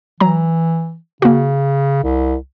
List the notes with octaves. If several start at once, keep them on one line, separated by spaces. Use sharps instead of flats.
E3 F#3 A#5
C#3 A#3 F#4
C2